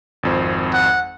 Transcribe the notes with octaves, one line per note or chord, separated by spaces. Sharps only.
G#1 F2 C5
F#5